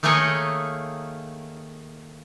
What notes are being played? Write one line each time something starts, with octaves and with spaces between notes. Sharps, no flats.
D#3 A3 A#3 G#4 C#5 D#5